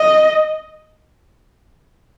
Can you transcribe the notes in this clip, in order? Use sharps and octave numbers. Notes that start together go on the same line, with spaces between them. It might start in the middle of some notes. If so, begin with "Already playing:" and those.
Already playing: D#5